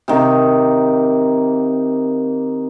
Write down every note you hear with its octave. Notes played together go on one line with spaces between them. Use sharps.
C3 D#3 A#3